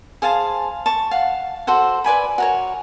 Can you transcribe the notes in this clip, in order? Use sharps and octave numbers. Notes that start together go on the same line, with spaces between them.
G#4 C5 F5 A5
A5 C#6
F5 F#5
F#4 A4 C5 F#5
B4 D5 G#5 B5
F#4 A#4 C#5